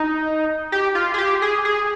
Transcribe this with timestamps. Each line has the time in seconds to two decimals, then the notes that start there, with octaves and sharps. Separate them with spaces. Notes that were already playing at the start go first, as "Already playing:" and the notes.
Already playing: D#4
0.72 G4
0.95 F4
1.14 G#4
1.18 G4
1.42 G#4
1.65 G#4